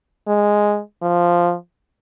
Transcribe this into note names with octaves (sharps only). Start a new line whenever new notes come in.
G#3
F3